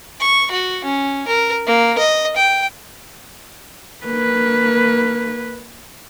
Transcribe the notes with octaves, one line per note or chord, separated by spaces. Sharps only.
C#6
F#4
C#4
A#4
A#3
D#5
G5
A#3 B4